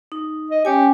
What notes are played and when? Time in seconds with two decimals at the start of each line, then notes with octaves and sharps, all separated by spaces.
0.12 D#4
0.50 D#5
0.65 C#4 G4 C#5 G#5